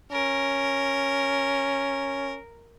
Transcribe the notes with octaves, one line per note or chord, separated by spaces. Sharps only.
C#4 A#4